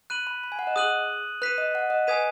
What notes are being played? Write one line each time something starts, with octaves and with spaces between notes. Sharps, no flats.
B5 F#6 D#7 F#7
B5
B5
G#5
F#5
D#5
G#4 D#6 F#6 D#7 F#7
B4 F#6 B6 D#7
D#5
F#5
D#5
B4 G#5 D#6 G#6 B6 D#7